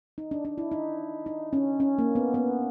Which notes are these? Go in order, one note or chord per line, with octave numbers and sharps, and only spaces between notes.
D#4
D4
D4
E4
D#4
D#4
C#4
C#4
A#3
B3
B3